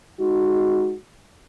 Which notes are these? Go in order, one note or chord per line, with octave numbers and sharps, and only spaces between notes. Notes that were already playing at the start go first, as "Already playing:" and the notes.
G#3 D#4 F#4